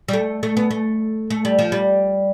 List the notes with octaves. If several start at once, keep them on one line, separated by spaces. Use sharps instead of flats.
G3
A3
A3
B3
A3
A3
G3
F3
G3